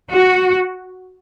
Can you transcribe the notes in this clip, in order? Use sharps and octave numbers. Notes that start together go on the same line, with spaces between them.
F#4